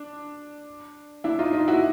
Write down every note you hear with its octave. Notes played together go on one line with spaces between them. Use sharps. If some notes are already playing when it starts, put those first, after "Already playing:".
Already playing: D4
D4 E4
D#4 F4
D#4 F4
E4 F#4